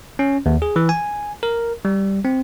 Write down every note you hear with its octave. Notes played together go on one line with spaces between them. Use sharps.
C#4
D#2
G#4
E3
G#5
A#4
G3
C4